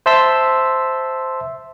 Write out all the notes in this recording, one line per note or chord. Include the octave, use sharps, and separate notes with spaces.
C5 E5 A5 C6 E6 B6